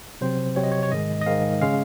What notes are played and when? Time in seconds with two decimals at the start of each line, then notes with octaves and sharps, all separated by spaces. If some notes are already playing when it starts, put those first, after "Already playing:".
0.21 C3 F#3 C4 C5
0.56 C3 F#3 C4 C#5
0.63 D#5
0.72 C#5
0.83 C#5
0.92 G#2 D#3 G#3 D#5
1.21 D#5
1.26 G#2 D#3 G#3 F5
1.61 C#3 G#3 C#4 F5